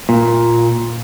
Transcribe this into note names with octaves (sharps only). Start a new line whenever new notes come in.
A#2